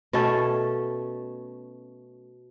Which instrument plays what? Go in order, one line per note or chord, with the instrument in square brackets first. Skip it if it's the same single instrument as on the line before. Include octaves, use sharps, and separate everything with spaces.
[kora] B2 A3 C#4 A4